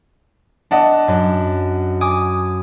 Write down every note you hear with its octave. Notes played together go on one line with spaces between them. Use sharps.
D4 D#5 F#5 A5
F#2
G#5 D6 D#6